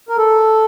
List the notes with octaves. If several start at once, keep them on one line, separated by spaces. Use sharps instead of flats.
A#4
A4